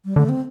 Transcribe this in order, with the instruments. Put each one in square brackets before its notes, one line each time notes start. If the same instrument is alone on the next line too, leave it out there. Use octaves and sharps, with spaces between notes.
[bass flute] G3
[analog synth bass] D3 [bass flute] A3
[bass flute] C4